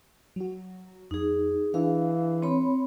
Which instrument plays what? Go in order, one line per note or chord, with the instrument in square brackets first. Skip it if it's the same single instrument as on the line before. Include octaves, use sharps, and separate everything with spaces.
[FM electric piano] F#3 F#4
[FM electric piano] F2 [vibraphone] D#4 G#4
[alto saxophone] E3 [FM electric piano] D4 G#4 [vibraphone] F5
[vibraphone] C4 C#5 B5